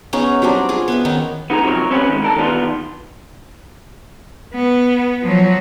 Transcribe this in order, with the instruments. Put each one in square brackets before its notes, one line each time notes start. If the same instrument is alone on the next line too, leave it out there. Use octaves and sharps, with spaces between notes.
[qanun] B3 C#4 D#4 G#4
F#3 G3 C4 D4
F4 G#4
B3 B4 E5
D#3 C#4 D#4
[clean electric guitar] B3 D#4 G#4 A#5
C3 F3 F#3 F#4 A#4 C#5
C4 C#4 E4 G4 B4
D#3 G#3
D3 A#4 A5
D#3 E3 G3 B3 D4 F4
[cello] B3
F3 F#3